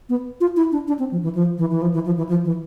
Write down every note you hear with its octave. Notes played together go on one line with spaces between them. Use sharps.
B3
F4
E4
D4
D4
C4
F3
E3
F3
E3
E3
F3
E3
F3
E3
F3
E3